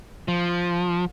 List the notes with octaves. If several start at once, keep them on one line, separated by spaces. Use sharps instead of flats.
F3